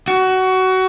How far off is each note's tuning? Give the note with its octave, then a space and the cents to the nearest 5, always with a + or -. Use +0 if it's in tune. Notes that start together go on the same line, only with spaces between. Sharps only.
F#4 +20